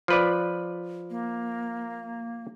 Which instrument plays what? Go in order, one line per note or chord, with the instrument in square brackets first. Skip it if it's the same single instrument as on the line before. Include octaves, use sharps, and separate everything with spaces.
[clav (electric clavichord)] F3 B4 D5
[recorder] A#3